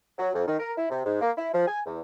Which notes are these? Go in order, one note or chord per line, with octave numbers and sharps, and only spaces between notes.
F#3
F2
D#3
A#4
E4
C3
G#2
A#3
E4
F3
G#5
E2